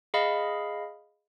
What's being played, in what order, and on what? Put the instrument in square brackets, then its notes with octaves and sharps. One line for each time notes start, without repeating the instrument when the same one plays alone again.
[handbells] G#4 D#5 F5 B5